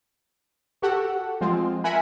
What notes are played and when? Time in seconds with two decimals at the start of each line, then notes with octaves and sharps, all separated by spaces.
0.82 F#4 G4 A4 F#5
1.41 F3 G#3 C4 F4
1.84 A#4 E5 F#5 G#5 B5